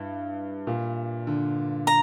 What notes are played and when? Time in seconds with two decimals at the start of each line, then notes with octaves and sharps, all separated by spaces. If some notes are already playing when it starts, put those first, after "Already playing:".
Already playing: G2 E4
0.67 A#2
1.27 D3
1.87 A#5